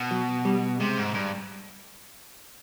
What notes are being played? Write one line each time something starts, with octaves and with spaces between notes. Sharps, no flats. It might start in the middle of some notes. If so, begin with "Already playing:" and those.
Already playing: B2
F#3
G3
C3 G#3
G#2
G2